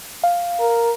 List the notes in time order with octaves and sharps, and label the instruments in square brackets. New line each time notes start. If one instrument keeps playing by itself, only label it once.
[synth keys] F5
[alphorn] A#4